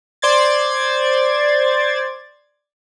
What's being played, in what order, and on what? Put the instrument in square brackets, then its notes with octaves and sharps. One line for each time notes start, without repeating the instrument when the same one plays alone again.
[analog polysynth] C5 D5 C6 G#6 A6